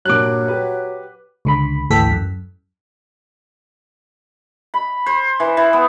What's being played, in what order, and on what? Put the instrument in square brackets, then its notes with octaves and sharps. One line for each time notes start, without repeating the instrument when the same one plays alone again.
[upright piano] G2 A#2 [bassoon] F#3 [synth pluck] D6 F#6
[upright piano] G4 B4 F#5
[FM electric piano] C#2 D3 B5
G#1 D2 E3 A4 G5 B6
F#2
[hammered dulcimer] B5
C5
E3
E3
B3